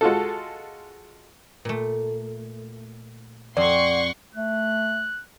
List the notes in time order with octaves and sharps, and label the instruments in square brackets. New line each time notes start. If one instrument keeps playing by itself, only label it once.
[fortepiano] G#3 F4 F#4 A4
[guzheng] A#2 A3
[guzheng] F2 [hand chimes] D5 [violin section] F#5 C6 C#6
[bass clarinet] A3 [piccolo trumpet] F#6